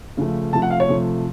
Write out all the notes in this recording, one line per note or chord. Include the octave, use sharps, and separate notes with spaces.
C#3 F3 A3
C3 F3 A3 A5
F#5
F5
C#5
C3 F3 A3